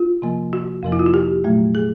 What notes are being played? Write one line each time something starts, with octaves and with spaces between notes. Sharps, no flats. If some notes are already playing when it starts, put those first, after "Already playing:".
Already playing: F4
C3 F3 A#3
F#4
F2 C3 F3 A#3
E4
F4
F#4
G4
A#2 F#3 A3
G#4